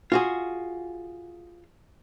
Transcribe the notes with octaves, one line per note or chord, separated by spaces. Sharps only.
F4 F#4 G#4